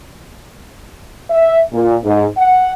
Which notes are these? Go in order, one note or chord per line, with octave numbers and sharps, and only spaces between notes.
E5
A#2
G#2
F#5